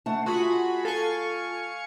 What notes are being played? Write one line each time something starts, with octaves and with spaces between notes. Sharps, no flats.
A3 F#5 A5
F4 F#4 G#4 B5
A4 F5 G#5 C#6